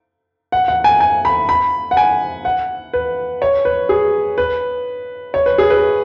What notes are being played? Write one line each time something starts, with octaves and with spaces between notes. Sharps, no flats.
F#5
F#5
G#5
G#5
B5
B5
F#5
G#5
F#5
B4
C#5
B4
G#4
B4
C#5
B4
G#4
B4